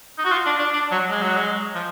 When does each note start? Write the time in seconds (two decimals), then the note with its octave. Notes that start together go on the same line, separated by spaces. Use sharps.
0.18 D#4
0.25 F#4
0.32 F4
0.46 D4
0.59 D4
0.73 D4
0.91 F#3
1.09 G#3
1.23 F#3
1.37 G#3
1.75 F3